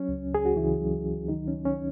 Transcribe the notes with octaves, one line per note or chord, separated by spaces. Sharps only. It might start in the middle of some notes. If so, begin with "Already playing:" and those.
Already playing: F#3 C#4
C#2
C#2 G#4
F#4
C#2 E3 E4
F#3
C#2
D#3 F#3 D#4
C#4
F#3
C#4